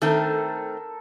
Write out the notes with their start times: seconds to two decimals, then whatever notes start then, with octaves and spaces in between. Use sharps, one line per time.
0.02 D#3 A3 C4 A4 A#4